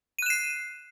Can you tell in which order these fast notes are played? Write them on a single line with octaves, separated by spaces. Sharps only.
D#7 F#6 E7 C7